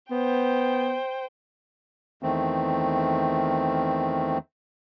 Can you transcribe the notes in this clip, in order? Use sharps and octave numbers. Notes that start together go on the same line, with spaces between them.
B3 C5 G5
E2 D#3 A3 C4